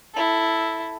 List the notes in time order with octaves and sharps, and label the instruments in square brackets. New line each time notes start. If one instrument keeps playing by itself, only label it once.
[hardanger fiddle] E4 A4